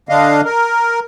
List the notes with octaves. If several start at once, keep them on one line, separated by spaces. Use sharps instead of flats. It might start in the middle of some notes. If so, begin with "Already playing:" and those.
D3 D4 D#5 F5
A#4